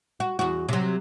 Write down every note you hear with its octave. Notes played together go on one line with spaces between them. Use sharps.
F#4
E2 F#4
C3 F#3